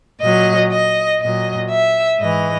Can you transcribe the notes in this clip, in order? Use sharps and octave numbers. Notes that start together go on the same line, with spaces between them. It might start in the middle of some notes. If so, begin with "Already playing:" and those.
A#2 F#3 D#5
D#5
A#2 F#3 D#5
E5
G#2 E3 D#5